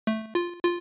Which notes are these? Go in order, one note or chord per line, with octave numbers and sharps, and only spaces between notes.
A3
F4
F4